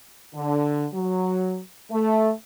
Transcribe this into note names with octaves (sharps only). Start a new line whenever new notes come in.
D3
F#3
A3